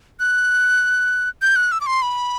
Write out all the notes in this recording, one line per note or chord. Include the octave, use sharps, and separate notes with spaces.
F#6
G6
F#6
E6
D6
C6
B5